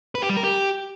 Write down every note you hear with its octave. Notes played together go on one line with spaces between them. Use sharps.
B4
G4
G3
A#4
G4